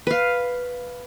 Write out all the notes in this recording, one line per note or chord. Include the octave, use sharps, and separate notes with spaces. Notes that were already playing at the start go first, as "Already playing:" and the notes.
B4 F5